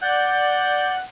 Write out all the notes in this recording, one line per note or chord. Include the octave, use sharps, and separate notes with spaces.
D5 F#5 F#6 G6